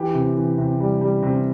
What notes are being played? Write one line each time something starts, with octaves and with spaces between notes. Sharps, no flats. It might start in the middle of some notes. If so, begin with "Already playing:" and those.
Already playing: E3 G4
C3
E3
C3
G3
G3
C3